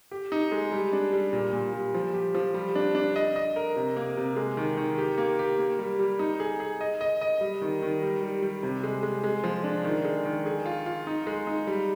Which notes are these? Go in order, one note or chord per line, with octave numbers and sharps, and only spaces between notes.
G4
D#4
G#3
G3
D4
G3
A#2
A#2
G3
F3
G4
F3
G3
D4
D4
D#5
D#5
A#4
C3
A#3
C3
G#3
D#3
D#3
G4
A#3
G4
A#3
G3
G3
D#4
G#4
G#4
D#5
D#5
D#5
G3
D#3
D#3
G3
G3
G3
C3
G#3
G#3
G#3
F3
D4
D#3
G#3
D#3
G#4
F4
F4
D#4
G#3
D#4
G3